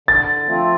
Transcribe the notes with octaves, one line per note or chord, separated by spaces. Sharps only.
D3 A6
F3 A3 C4 F4